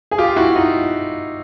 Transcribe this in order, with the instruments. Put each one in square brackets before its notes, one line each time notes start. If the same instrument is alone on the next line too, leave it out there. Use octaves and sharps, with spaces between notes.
[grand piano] G#4
F4 G4
E4 F#4
D#4 F4